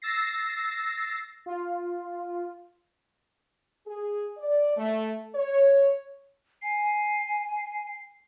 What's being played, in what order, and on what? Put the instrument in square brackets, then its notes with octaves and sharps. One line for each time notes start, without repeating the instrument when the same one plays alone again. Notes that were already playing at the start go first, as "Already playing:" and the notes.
[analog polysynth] E6 A6 A#6 C7
F4
[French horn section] G#4
D5
A3
C#5
[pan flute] G#5 [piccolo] C7